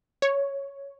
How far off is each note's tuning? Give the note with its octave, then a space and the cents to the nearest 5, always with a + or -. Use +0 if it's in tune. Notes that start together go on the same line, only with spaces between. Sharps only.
C#5 +5